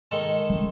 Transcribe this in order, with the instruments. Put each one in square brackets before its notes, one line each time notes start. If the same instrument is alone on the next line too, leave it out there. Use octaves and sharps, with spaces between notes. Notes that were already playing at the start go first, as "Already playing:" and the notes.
[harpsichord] D#3 G#3 D#4 A4
[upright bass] C#3